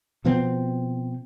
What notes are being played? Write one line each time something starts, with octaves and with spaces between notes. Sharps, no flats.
B2 F3 B3 C4